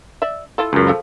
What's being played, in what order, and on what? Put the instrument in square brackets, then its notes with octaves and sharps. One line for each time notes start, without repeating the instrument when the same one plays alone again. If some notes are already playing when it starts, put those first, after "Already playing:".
[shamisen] D5 E5
E4 F4 A4
[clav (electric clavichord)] C#2 F#2
[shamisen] F3 A4